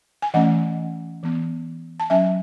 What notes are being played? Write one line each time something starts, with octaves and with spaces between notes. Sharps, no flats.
G#5
E3 A3 C#4 D#5 F#5
E3 B3
A5
F#3 C#4 E5 G#5